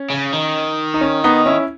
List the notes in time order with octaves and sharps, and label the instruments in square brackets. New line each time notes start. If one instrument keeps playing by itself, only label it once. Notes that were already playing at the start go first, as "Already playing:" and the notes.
Already playing: [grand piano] C#4
[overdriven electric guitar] C#3
D#3
[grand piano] D#4
C#4
B3 D#4
C#4 E4